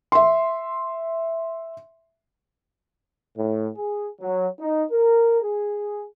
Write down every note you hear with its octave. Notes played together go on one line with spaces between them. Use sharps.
E5 C6
A2
G#4
F#3
D#4
A#4
G#4